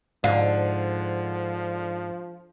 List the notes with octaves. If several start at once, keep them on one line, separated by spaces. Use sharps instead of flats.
G#2 D3 F3 F5